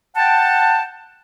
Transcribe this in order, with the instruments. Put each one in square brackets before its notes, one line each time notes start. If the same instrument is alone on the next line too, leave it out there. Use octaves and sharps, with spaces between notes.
[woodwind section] F#5 G5 A5